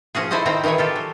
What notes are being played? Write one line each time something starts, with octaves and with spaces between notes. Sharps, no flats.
F3 C#4 F#4 G#4
E4 A4 C5 C#5 D#5
A#2 D#3 C4 E4 G5 A#5
D#3 E3 E4 G#4 C#5
F4 G4 A4
F#3